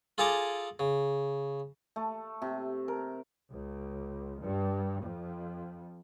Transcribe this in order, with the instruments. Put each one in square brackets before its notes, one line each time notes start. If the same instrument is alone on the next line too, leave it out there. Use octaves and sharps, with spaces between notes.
[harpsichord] F4 G#4 A4 G#5 A#5 D6
C#3
[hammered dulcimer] A3
C3
A#4
[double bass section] C#2
G2
F2